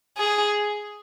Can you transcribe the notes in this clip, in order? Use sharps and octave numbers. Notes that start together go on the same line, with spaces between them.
G#4